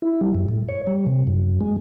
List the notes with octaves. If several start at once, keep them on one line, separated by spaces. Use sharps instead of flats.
E4
G3
F#2
A2
C#5
G3
C3
F#2
G#3